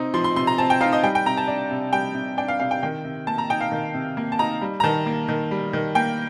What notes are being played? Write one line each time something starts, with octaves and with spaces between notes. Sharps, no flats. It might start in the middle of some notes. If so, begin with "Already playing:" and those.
Already playing: C3 C4 D#4
F3 C6
C6
C3 C6
A#5
C4 A5
G5
D#4 F5
D#5
G3 G5
G5
C3 A#5
A5
D4
C3
G3 G5
C3
D4 G5
F5
C3 F5
G5
D#3 G5
C3
A#3 A5
A#5
D#4 G5
F5
D#3
C3
A#3
A5
D#4 A#5
G3
A#5
D#3 A5
A#3
D#3
G3
D#3
A#3 G5